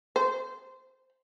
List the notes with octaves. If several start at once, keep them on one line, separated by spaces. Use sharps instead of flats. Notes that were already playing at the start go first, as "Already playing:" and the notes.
C5